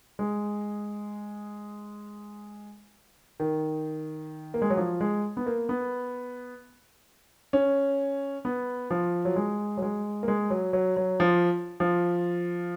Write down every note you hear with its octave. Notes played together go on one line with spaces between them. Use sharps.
G#3
D#3
A#3
G#3
F#3
F3
G#3
B3
A#3
B3
C#4
B3
F3
F#3
G#3
F#3
G#3
A#3
G#3
F#3
F#3
F#3
F3
F3